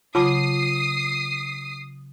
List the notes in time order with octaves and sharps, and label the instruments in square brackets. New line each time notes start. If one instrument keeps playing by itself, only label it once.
[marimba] C#3 F#3 [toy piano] F4 A5 D6 [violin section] D#6 C7